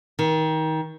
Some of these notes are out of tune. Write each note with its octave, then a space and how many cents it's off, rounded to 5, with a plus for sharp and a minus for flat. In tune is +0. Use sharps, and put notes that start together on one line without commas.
D#3 +25